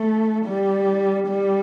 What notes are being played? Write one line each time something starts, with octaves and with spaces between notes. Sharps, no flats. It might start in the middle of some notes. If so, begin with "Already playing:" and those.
Already playing: A3
G3
G3